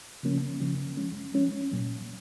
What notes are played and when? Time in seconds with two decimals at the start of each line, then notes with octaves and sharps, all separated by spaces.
0.23 C#3 F3 A#3 C#4
0.60 C#3 F3 A#3 C#4
0.97 F3 G#3 C#4
1.34 F3 G#3 C#4
1.71 A#2 F#3 A#3